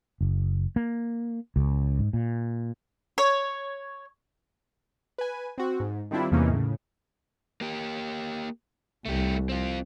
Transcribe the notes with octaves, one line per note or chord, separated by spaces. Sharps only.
F#1
A#3
C#2
G#2
A#2
C#5
B4 G#5
C4 F#4
G#2
D#3 G3 C4 D4 E4 F4
E2 C3 E3 A#3 C#4 D#4
A2 C#3
A#3 G4
C2 A3 G4
C4 F4